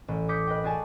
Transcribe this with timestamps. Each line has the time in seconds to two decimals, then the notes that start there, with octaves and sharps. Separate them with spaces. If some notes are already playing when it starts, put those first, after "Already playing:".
0.08 A1
0.29 D6 D#6 G6 B6 C#7
0.47 B4 D#5 G5
0.64 F#4 G#4 D5 G#5 A5